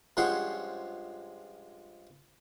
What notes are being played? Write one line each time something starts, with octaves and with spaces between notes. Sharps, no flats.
G2 F3 G#3 C#4 C5 F#5